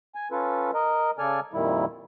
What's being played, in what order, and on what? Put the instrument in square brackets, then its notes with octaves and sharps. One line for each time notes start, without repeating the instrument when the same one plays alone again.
[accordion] G#5
C#4 F4 A4 B4
A#4 D#5
C#3 A4 D5 G#5 F6
F2 A#2 D#3 G3 E4